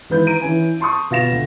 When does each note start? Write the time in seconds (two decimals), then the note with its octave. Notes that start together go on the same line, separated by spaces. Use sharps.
0.10 G#1 E3 B4 G6
0.27 B4 A#5 D7 D#7
0.41 E3 C#4 G#5
0.80 A5 C6 C#6 D#6
1.11 B2 F4 A#6 E7
1.32 D2